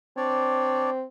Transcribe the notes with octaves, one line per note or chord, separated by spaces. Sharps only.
C4 D4 C#5 D5